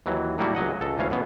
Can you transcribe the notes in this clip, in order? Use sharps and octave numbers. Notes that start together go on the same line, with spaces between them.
D#2 E3 F#3
A2 F#3 G3 A#3 E4 F#4
C#2 F#3 D#5 F#5
C#2 A4
D2 E3 C#4 F5
F#2 B2 B3